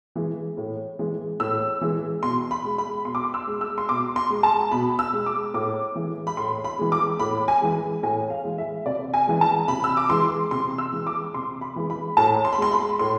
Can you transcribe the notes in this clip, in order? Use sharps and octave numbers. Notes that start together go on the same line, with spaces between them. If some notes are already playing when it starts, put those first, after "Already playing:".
E3 G#3
A2
E3 G#3
A2 E6
E3 G#3
B2 C6
B5
G#3
B5
B2 C6
D6
C6
E6
G#3
E6
C6
B2 D6
C6
G#3
A5
B2 B5
E6
G#3
D6
A2 D6
E3 G#3
B5
A2 C6
B5
E3 G#3
D6
A2 B5
G#5
E3 G#3
A2 G#5
F5
E3 G#3
E5
C3 D5
G#5
E3 G#3
A5
C3 B5
E6
D6
E3 G#3 C6
C3 C6
E6
E3 G#3
D6
C3 C6
B5
E3 G#3
B5
A2 A5
C6
B5
G#3 C6
B5
A2 C6